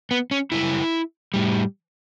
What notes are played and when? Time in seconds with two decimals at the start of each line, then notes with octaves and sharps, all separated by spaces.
0.11 B3
0.31 C#4
0.52 F#2 C#3 G3 E4
1.34 A2 G3